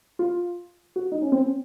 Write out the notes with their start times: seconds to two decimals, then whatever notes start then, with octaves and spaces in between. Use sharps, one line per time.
0.19 F4
0.96 F#4
1.12 D#4
1.22 C#4
1.32 C4
1.42 C#4